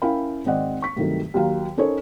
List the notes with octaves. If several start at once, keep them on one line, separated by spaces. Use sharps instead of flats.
C#4 E4 A#4 F5 G5 B5
G#1 G#3 C4 D5 D#5 F#5
C#6 B6
G2 C3 D#3 F#3 A3
D#2 F#3 F5 A#5
C#4 D#4 A4 A#4 C5 C#5